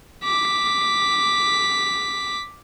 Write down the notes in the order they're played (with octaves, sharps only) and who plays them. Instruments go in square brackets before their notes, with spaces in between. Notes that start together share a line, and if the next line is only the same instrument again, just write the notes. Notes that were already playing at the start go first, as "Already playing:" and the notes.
[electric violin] D6 B6